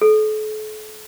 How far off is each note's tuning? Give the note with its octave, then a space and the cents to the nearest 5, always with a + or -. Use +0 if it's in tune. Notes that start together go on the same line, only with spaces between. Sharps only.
A4 -40